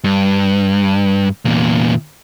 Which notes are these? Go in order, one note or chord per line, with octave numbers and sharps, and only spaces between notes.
G2
E2 A#2